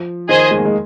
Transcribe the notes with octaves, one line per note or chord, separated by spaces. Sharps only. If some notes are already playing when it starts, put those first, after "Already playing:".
Already playing: F3
D#3 G#4 C5 D#5 G#5
G#3
A#3
G#3